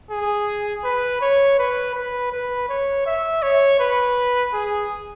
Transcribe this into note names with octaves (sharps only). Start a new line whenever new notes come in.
G#4
B4
C#5
B4
B4
B4
C#5
E5
C#5
B4
G#4